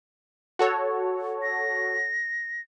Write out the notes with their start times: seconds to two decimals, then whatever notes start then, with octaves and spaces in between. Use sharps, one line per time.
0.59 F#4 A4 C#5
1.42 A#6